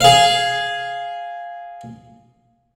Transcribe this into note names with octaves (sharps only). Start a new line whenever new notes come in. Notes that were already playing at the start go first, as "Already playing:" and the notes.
G#4 F5